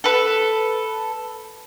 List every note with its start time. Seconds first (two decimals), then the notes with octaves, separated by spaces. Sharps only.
0.04 A4 B4